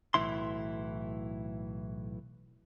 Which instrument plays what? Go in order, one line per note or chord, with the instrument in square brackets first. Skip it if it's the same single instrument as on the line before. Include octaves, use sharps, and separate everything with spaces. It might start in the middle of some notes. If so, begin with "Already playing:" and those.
[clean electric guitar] B1 A2 E3 E4 C6